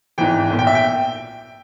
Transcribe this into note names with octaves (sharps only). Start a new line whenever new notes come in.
G#1 G#2 E3 G5
B1 A#2
G5
E5
G5